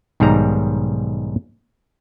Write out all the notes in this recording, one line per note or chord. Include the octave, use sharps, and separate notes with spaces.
B1 G#2 D#3 G3 A#5